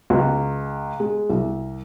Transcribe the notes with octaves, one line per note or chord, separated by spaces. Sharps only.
C#2
G#3
C2